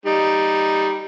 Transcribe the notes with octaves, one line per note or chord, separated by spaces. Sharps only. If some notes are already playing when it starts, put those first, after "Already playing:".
G3 D#4